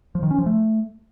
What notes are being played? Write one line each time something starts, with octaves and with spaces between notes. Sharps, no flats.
F3
D#3
C#4
F3
A3